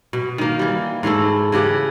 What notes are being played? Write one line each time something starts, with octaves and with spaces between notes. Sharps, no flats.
B2
D#3 A#3
E3 G3
G#2 E3 A3 E4
C#3 E3 G4 F#5